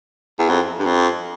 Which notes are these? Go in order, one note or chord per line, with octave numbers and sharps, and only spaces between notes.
E2
F2
G2
F2